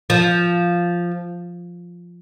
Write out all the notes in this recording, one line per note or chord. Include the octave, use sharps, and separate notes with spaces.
F3